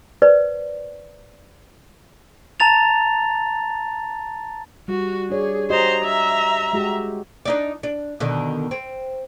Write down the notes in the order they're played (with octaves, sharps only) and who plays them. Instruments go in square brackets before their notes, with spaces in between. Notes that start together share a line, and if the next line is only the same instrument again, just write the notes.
[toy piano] B4 C5 D5
[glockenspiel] A5 A#5 A6 F7
[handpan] G3 [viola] F#4
[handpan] D4 C#5 D5 [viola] G#4
[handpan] F#4 G4 D#5 [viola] C5 A#5
[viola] E5 A#5
[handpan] G#3 F#4 G4
[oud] D4 D#4 D5
D4
B2 D3 D#3
C4